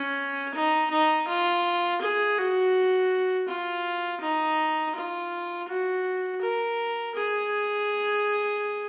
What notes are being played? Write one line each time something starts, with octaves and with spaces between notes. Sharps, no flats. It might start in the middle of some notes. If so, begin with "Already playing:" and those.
Already playing: C#4
D#4
D#4
F4
G#4
F#4
F4
D#4
F4
F#4
A#4
G#4